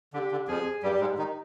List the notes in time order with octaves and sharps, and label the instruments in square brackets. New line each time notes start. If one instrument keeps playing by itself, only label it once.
[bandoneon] D3 [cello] G4
[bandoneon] D3
[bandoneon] F2 F3 [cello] G#4
[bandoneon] G2 G3 [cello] G4
[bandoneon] G3
G#2 G#3
D#3 D#4